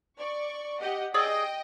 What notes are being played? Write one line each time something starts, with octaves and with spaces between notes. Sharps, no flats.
D5 C#6
G4 D#5 F#5
G#4 D5 D#5 G5 D#6 E6